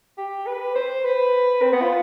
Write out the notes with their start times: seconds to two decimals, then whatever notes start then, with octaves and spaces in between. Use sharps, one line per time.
0.18 G4
0.47 B4
0.75 C5
1.05 B4
1.62 C4
1.73 B3
1.82 F4